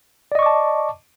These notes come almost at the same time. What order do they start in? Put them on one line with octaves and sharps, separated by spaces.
D5 D#5 C#6 D6 A5